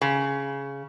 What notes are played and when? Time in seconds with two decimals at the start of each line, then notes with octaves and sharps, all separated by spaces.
0.02 C#3